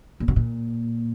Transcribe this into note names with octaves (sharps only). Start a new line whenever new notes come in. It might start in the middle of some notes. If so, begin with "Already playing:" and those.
A#2
B2
A#2